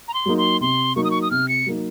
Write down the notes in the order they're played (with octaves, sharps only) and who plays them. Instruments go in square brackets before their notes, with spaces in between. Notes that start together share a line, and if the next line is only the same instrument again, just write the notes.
[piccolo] A#5
C6
[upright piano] F#3 A#3 D#4
[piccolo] C6
[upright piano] C3 [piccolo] C6
[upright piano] F#3 A#3 D#4 [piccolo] C#6
[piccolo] D#6
C#6
D#6
[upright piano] C3 [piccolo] F6
[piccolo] C#7
[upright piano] F#3 A#3 D#4